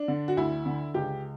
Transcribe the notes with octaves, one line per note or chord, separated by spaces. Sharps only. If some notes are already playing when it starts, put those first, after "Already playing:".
Already playing: D4
D3
F#4
D2 E4
D3
C#2 G4